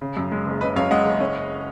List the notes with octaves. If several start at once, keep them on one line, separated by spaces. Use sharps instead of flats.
C#3
F#2
G#3
F#1
C#3 B4 D#5
F#2 C#5 F5
G#3 D#5 F#5
F#1
C#4